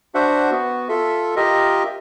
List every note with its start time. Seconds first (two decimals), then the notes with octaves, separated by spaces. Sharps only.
0.15 D4 F#4 C5 E5 F#5
0.52 B3 F#4
0.89 F4 A4 E5
1.36 F4 G4 A#4 D#5 E5